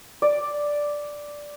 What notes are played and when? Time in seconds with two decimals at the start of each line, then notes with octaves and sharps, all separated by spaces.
0.22 D5